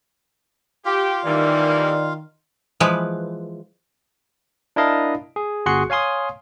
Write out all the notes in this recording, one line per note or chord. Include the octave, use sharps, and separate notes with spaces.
F4 G4 F5
D#3 E3 G3 A#3 D5
E3 F3 G#3 B4
D4 E4 A#4 D#5 F5 A5
G#4
G1 F#4 G#4 C6 F#6 C#7
C#5 F5 G#5 C6 D#6